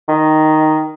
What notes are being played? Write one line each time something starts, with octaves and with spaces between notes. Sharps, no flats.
D#3